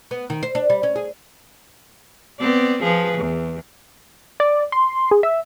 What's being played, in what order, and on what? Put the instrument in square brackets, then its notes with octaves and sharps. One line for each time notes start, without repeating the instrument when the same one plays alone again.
[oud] B3
D#3
C5
D4
G3
C#4
G#4
[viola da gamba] B3 C4 D5
F3 G#4 B4
E2
[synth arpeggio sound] D5
C6
G#4
E5